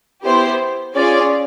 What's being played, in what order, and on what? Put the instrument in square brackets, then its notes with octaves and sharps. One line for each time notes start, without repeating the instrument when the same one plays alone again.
[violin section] B3 E4 G4 C5
C#4 F4 G#4 D5